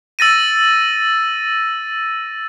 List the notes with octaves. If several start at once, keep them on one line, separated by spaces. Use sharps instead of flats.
E6 A6 A#6 D#7